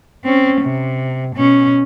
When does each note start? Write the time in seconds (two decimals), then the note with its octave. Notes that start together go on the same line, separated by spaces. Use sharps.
0.25 C4 C#4
0.61 C3
1.36 B2 C#4